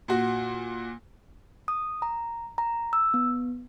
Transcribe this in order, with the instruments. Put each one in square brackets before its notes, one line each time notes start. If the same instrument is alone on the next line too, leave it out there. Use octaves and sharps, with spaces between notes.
[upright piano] A#2 F#4
[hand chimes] D#6
A#5
A#5
E6
B3